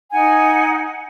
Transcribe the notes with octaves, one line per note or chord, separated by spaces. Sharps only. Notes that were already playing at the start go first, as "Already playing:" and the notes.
D#4 F#5 G#5